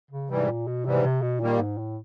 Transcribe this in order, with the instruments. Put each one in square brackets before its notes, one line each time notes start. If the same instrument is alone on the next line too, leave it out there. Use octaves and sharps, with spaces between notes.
[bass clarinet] C#3
[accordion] G#2 E3 G3 [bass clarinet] C3
[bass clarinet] A#2
B2
[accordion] G#2 E3 G3 [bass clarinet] C3
[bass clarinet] C3
B2
[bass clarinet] A#2 [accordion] D#3 G3 A#3
[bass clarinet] G#2
A2